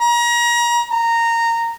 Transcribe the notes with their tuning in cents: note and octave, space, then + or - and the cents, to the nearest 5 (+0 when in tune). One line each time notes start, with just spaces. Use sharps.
A#5 +35
A#5 -15